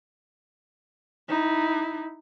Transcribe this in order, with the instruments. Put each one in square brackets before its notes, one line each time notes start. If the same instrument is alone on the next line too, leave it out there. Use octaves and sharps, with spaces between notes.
[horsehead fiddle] D#4 E4